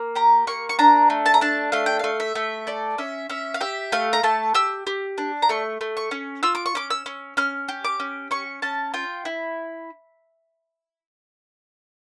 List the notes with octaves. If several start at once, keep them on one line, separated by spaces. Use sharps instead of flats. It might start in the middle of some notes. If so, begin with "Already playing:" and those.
Already playing: A#3
G4 A#5
A#3 C#6
C#6
D4 A#5
A3
A5
A#5
D4 A5
A3 F5
G5
A3 F5
E5
A3
A4 D5
C#4 E5
C#4 E5
F5
G4 E5
A3 F5
A#5
A3 A5
G4 E6
G4
D4
A#5
A3 C#6
A3
C#6
C#4
F4 E6
D6
C#6
C#4 D6
E6
C#4
C#4 F6
G4
D6
C#4
C#4 C#6
C#4 A5
F4 G5
E4